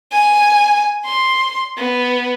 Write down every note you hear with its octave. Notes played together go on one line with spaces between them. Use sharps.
G#5
C6
B3